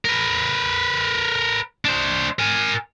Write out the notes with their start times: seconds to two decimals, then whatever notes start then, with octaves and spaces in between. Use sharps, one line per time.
0.05 A#4 B4
1.85 D4 C5
2.39 A#4 G#5